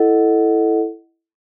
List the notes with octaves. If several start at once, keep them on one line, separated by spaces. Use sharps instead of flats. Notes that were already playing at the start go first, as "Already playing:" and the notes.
Already playing: E4 A4 D#5 F#5